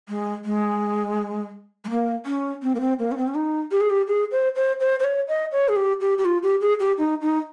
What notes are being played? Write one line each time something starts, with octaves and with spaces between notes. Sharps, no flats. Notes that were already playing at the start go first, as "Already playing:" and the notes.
G#3
G#3
G#3
A#3
C#4
C4
A#3
C4
A#3
C#4
C4
C#4
D#4
G4
G#4
G4
G#4
C5
C5
C5
C5
C#5
D#5
C#5
G#4
G4
G4
G4
F4
G4
G#4
G4
D#4
D#4